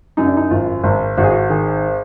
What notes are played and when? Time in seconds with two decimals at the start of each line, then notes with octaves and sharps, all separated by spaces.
0.17 F#2 D#4
0.27 D4
0.37 D#4
0.51 G#1 F4
0.84 G#1
1.18 G#1 F#4
1.23 G#4
1.31 F#4
1.50 D#3 G#4